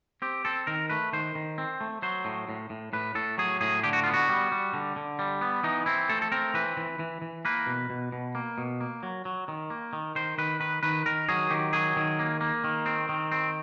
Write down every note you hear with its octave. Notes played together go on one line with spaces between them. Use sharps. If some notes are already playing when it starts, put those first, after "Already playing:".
C4 G4
C4 A4
D#3 A#4
A3 B4
D#3 C5
D#3
C4
A3
F#3 C5
A2
A2
A2
A2 B4
A2 A4
F#3 G#4
A2 G#4
D3 G4
F#4
B3 F4
F#4
G3
G3
D3
D3
G3
B3
E3 D#4
C4 E4
A3 A4
A4
C4 A#4
E3 B4
E3
E3
E3
A#3 B4
B2
B2
B2
A#3
B2
A#3
F#3
F#3
D#3
A#3
D#3
D#3 C5
D#3 B4
D#3 B4
D#3 B4
D#3 A#4
F#3 G#4
D#3 G4
F#3 G#4
D#3
A#3
A#3
D#3
C4
D#3
C4